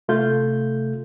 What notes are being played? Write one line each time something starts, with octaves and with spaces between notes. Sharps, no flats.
C3 A3 F4 A4 G6